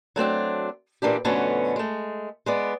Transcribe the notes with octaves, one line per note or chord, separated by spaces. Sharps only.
F#3 A3 C4 D4
A#2 E3 A#3 D4 G4
F2 B2 D3 A3 B3 C#4
G#3 A3
G#3 B3 D5